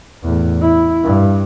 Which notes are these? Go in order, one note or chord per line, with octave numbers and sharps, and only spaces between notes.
E2 A2
E4
G2